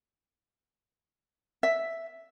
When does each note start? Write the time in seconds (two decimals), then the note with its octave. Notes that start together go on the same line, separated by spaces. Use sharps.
1.63 E5